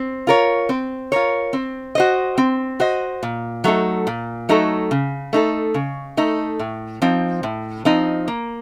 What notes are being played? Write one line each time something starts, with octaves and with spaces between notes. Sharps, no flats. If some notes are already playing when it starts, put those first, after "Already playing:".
Already playing: C4
F4 A#4 C#5
C4
F4 A#4 C#5
C4
F#4 C5 D#5
C4
F#4 C5 D#5
A#2
F#3 A3 D#4 A4
A#2
F#3 A3 D#4 A4
C#3
A3 D#4 A4
C#3
A3 D#4 A4
A2
F3 C4 D#4
A2
F3 C4 D#4
A#3